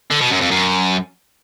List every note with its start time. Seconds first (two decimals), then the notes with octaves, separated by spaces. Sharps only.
0.10 D3
0.20 B2
0.30 F#2
0.40 F2
0.50 F#2